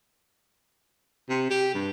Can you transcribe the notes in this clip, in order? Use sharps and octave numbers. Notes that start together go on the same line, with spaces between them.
C3
G4
G2